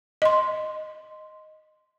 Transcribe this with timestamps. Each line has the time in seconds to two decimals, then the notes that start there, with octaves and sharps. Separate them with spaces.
0.22 D#5 C6